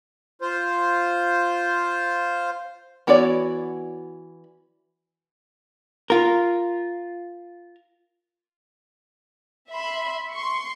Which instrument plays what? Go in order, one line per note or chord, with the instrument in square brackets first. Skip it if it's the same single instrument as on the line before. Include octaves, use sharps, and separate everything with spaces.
[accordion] F4 C5
[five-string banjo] E3 B3 F#4 C#5 D5
[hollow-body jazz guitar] F4 A#4
[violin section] E5 B5 C6
C6 C#6